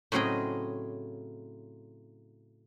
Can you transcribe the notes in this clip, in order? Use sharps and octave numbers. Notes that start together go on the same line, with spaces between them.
A2 C#3 F#3 C4 G#4 D#5